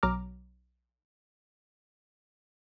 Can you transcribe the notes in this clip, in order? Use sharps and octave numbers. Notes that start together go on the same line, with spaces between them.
B1 F#3 A#5 D6 F6